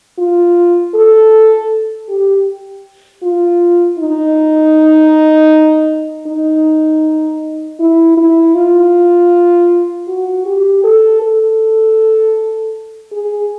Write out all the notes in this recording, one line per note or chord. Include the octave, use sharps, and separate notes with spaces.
F4
A4
G4
F4
D#4
D#4
E4
E4
F4
F#4
G4
A4
A4
G#4